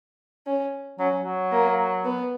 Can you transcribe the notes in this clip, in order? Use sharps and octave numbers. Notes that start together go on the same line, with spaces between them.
C#4
F#3 C#4
F#3
A#3
B3